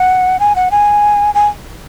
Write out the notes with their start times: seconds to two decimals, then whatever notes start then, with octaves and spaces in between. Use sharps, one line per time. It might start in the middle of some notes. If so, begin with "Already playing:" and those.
Already playing: F#5
0.40 G#5
0.55 F#5
0.71 G#5
1.34 G#5